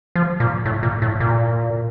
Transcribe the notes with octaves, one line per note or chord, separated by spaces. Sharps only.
F3
A#2
A2
A#2
A2
A#2